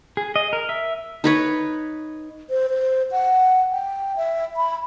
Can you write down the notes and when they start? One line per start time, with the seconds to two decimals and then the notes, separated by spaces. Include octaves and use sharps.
0.17 G#4
0.36 D#5
0.53 A#4
0.69 E5
1.24 D#4 B4 C#5
2.50 C5
2.70 C5
3.12 F#5
3.72 G5
4.16 E5
4.57 B5